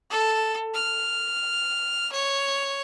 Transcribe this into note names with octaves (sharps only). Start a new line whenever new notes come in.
A4
F6
C#5